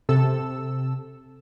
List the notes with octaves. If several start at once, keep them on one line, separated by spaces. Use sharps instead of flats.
C3 A4 E6